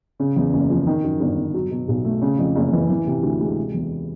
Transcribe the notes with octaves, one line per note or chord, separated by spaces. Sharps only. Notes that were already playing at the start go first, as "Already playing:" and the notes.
C#3
E2
F#1
F3
D#3
F#2
G1
G1
F#3
B2
B1
A3
C#3
F2
F#1
E3
E3
C3
D2
G#3
C3
E2